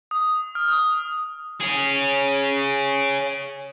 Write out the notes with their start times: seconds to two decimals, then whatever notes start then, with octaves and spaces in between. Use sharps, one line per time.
0.11 D#6
0.55 F6
0.68 D#6
1.61 G#4 C#5